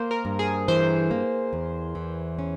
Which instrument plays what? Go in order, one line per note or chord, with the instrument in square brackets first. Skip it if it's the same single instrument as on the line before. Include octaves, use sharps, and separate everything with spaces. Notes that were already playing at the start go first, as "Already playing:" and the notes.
Already playing: [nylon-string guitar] A#3 [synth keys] C5
[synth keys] A#4
[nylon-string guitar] G2
[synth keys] G#4
[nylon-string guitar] E3 [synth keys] C5
[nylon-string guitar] A#3
E2
E3
C#4